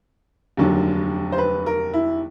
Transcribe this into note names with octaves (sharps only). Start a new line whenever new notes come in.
F1 D#2 D3 F#3
C5
B4
A#4
E4